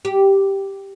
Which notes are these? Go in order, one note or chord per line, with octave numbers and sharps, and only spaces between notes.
G4